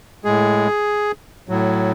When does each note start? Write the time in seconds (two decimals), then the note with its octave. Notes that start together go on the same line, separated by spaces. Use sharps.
0.25 A2 G#3 G#4
1.49 A2 F#3